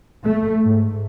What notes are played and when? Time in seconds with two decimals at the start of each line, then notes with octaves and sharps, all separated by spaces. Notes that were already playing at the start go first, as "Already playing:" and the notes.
0.24 A3
0.62 G#2